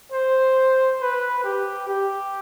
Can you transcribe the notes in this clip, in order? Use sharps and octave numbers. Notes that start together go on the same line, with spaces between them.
C5
B4
G4
G4